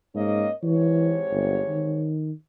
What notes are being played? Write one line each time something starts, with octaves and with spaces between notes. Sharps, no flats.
G#2 A#3 C#4 D#5
G#2 C3 E3 C#5
G1
D#3